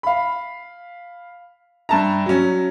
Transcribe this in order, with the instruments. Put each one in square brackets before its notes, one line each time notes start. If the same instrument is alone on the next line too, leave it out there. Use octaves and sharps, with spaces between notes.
[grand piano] F5 B5
[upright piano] G2 A5 A#5 [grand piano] E5
[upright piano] F#3 C#4